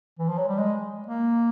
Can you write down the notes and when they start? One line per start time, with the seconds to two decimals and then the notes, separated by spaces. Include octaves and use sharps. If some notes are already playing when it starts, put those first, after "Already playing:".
0.19 E3
0.28 F3
0.38 F#3
0.48 G3
0.58 G#3
1.07 A#3